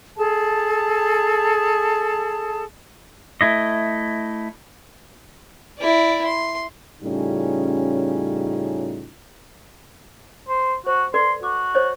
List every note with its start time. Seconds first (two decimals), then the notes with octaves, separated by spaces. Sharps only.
0.17 G#4 A4 A5
3.41 A3 E4 D#5
5.79 E4 D5
6.25 C6
7.03 A2 C#3 G3 C#4 D#4 F4
10.48 C5
10.86 F#4 C5
11.14 A4 B4 D5 C6
11.43 F#4 D6
11.75 C5 C#5 D#5